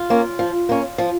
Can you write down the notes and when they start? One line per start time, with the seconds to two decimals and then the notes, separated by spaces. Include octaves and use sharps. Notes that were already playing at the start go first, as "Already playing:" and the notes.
Already playing: F4
0.10 A#3 C#4
0.39 F3
0.69 A#3 C#4
0.98 F3